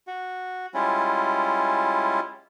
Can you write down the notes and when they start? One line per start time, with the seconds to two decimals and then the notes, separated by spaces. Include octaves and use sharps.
0.07 F#4
0.74 G3 G#3 C#4 E4 F4